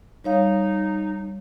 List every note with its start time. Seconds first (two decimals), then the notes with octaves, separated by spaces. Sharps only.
0.24 G3 D#4 C#5 F5